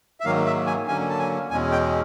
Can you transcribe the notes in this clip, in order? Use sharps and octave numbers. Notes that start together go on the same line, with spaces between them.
E5
G#2 D#3 F#3 A#3 F5
E5
G#5
D3 F#3 A#3 C#4 G#5
A5
G#5
E2 B2 G#3 C#4 G#5
G5